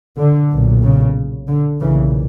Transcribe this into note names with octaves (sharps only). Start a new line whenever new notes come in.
D3
B1 A#2
C#3
D3
B1 A#2 C#3 E3